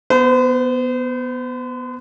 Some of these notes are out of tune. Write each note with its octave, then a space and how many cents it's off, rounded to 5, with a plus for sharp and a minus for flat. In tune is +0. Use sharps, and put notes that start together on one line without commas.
B3 +0 C5 -40